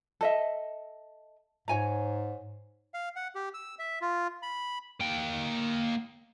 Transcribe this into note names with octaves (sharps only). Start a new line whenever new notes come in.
A4 D#5 E5
G#2 C#5 G#5 A#5
F5
F#5
G4
E6
E5
F4
B5
A#3 G5